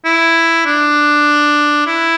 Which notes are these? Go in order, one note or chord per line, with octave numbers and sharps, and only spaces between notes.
E4
D4
E4